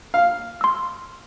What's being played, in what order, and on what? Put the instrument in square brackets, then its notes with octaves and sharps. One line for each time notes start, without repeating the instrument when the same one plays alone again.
[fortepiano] F5
[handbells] C6 E6